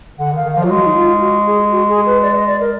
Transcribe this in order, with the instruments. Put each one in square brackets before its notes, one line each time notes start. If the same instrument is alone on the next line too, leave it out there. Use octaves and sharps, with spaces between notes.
[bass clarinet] D3 [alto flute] F#5
[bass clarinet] D#3
[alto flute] F5
[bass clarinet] D#3
[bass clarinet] F3 [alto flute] F5
[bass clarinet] F#3 [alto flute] F4
[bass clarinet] G#3 [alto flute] F#4
[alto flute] D#4
F4
F#4
G#4
F#4
G#4
B4
D5
D#5
D5
A#4